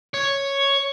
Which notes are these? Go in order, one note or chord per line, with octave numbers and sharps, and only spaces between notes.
C#5